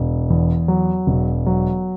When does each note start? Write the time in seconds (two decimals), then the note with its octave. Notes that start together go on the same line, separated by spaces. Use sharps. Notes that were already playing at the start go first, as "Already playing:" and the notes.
Already playing: E1
0.30 E2
0.68 F#3
1.07 E1
1.46 F#3